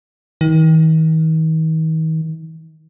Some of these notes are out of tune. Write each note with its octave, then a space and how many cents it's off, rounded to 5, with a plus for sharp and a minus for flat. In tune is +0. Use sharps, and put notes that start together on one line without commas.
D#3 +40